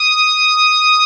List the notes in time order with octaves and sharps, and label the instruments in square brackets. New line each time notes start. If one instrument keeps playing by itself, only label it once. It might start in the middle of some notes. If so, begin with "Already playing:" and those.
Already playing: [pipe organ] D#6